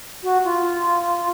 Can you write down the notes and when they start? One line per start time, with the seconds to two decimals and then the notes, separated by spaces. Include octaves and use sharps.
0.23 F#4
0.44 F4